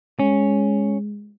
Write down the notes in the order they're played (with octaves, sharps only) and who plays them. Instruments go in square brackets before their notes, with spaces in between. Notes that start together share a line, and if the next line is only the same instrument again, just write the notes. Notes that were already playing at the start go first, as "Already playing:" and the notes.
[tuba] G#3 [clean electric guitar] C#4